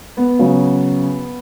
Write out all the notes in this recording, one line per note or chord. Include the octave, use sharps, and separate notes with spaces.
B3
C#3 F#3